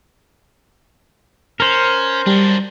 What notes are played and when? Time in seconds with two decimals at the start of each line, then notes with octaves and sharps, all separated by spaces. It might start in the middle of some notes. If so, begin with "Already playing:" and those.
1.60 C#4 A#4 C5
2.26 F#3 G3 D4